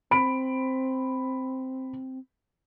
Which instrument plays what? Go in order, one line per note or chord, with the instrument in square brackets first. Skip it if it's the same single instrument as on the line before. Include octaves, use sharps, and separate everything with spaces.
[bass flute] C4 [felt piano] B5 D7